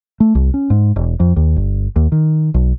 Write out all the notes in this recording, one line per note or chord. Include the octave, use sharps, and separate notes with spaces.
A3
C2
C#4
G#2
E1
F2
D#2
G1
D#2
D#3
B1